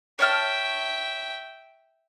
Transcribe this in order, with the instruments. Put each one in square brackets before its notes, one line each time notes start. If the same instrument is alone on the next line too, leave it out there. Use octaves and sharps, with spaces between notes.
[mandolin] C#5 A5 F6 [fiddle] E5 G5